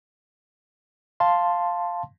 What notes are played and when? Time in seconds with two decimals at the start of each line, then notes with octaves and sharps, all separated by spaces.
1.20 F5 A5 C6